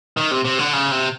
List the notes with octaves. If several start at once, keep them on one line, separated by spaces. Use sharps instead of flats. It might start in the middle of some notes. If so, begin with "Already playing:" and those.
D#3
C3
C3
D3
C#3
C3